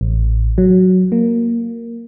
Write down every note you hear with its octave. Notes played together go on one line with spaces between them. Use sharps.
A1
F#3
A#3